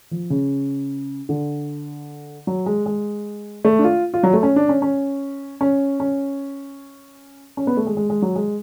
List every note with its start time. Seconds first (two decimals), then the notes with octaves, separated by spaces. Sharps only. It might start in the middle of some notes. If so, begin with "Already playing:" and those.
0.11 F3
0.30 C#3
1.29 D3
2.47 F#3
2.66 G#3
2.86 G#3
3.65 A3
3.79 D4
3.84 F4
4.14 F4
4.23 F#3
4.33 A3
4.43 C#4
4.56 D4
4.69 C#4
4.82 C#4
5.61 C#4
6.00 C#4
7.57 C#4
7.67 B3
7.77 A3
7.87 G#3
7.97 G#3
8.10 G#3
8.22 F#3
8.36 G#3